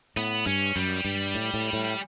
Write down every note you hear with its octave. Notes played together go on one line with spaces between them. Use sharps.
A2 B3
G2 C#4
F#2 G3
G2
A2
A2
A2